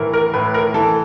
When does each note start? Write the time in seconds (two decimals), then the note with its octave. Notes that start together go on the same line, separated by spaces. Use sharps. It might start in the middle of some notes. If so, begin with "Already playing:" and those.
Already playing: A2 E3 A#4
0.13 A#4
0.34 A2 B4
0.54 A#4
0.74 E3 A4